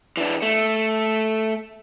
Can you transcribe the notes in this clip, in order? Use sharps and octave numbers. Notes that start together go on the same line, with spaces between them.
E3 D4
A3